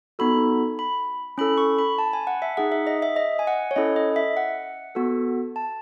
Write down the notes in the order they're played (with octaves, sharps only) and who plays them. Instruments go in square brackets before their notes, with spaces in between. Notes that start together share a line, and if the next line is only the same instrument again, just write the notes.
[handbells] B3 D#4 F#4 A4 B5
B5
C#4 E4 A4 B5
C#6
B5
A5
G#5
F#5
E5
D#4 G#4 F#5
E5
D#5
E5
D#5
G#5
F#5
C#5
C#4 E4 A4 D#5
D#5
E5
F#5
B3 F#4 A4
A5